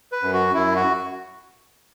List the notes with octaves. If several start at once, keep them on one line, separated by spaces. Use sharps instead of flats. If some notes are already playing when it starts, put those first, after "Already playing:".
B4
F#2
F#4
F#2 E4
F#4